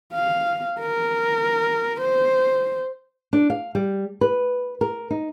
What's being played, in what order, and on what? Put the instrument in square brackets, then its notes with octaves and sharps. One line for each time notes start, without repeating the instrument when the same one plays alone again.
[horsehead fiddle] F5
A#4
C5
[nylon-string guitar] D4
F5
G3
B4
A#4
D#4